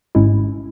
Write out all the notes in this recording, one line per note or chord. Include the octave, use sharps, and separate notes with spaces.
G#1 G#2 G#3 C#4 E4